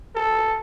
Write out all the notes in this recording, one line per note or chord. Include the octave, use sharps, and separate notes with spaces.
A4